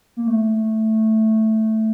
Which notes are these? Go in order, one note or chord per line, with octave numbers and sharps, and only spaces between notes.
A#3
A3